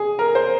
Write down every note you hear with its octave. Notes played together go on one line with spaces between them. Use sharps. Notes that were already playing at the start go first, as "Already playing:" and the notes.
Already playing: G#4
A#4
C5